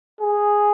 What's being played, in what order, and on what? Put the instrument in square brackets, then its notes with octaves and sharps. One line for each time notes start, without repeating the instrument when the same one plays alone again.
[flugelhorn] G#4